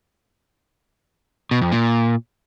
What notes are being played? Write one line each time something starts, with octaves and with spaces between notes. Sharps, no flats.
B2
F2
A#2